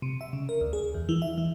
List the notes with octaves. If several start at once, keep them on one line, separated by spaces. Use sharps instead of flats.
C3
E5
C#3
A#4
D2
G#4
E2
E3
E5
E3